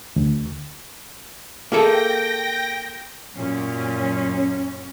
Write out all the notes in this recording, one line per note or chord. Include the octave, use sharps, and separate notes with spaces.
D2
A#3 G#4 A4 G5 A#6
F#2 A#2 F#3 C#4